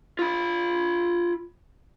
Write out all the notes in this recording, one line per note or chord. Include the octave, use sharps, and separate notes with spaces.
F4 B5